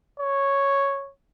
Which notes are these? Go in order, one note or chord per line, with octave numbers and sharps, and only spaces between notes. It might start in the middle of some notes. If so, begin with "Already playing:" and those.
C#5